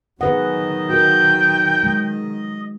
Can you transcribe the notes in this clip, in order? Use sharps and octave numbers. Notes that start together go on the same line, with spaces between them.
D#3 F#3 G#4 B4 D#5 F#5
F#4 A#4 G5
G#3